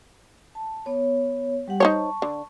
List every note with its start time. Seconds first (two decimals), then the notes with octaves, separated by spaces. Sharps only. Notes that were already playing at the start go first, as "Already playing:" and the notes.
0.55 A5
0.86 B3 C#5
1.68 G3 G4 F#5
1.80 D#4 C5 C#5 A5 C#6
2.22 D3